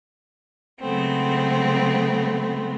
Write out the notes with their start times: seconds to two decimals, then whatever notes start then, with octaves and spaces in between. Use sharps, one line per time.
0.80 C#3 F#3 G#3 A3 B3 C4